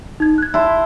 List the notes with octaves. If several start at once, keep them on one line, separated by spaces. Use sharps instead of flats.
D#4 G#6
F#6 G#6
E4 A5 C6